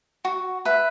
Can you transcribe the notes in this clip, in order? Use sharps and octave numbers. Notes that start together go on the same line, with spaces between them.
F#4
B4 E5